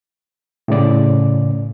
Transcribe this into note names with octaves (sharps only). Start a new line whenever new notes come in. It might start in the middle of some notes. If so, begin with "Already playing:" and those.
A2 C#3 D5